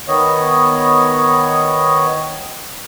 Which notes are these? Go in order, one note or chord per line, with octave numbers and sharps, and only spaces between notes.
D#3 B3 C#5 D#5